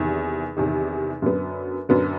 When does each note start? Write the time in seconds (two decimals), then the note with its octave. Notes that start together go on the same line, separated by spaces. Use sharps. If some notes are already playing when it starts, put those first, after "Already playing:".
Already playing: E2 C3 D#3
0.57 E2 C3 D#3
1.22 F#2 D3 F#3 B3
1.89 F#2 D3 F#3 B3